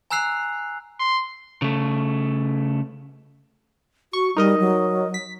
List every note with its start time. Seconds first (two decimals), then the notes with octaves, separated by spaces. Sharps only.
0.10 G#5 A#5 E6 F#6 C7 F7
1.00 C6
1.62 C#3 A3
4.13 F#4 C#6
4.37 G3 D#4 A#4 D#5
4.60 F#3
5.14 B6